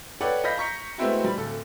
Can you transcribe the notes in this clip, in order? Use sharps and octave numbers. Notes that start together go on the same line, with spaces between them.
A4 B4 C#5 D5 F#5 G5
D#5 F5 B5 G6 A#6 B6
A#5 C#6 B6 C#7
G#3 A3 B3 C4 E4 F#4
G3 B5
D1 A4